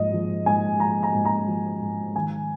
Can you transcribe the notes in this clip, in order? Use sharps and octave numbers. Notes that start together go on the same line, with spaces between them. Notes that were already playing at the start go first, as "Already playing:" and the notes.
Already playing: G#2 F3 D#5
F3
G#2 G#5
F3 A#5
A#5
G#2
A#5
F3
G#2
D#3 G#5